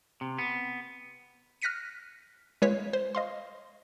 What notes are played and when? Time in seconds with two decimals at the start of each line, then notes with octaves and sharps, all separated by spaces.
0.21 C3
0.39 B3
1.62 F6 F#6 A#6 B6 C#7 D#7
2.62 G#3 F4 B4 C#5 B6
2.93 C5
3.15 D#5 F5 C6